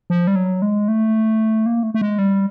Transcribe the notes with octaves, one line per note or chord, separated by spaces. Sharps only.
F3
G3
F#3
G#3
A3
A#3
A3
A3
G#3
G3